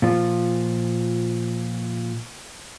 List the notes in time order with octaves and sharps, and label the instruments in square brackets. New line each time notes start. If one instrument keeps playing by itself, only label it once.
[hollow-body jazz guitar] A#2 F3